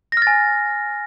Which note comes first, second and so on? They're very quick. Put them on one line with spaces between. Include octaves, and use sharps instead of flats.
A#6 F6 A6 G#5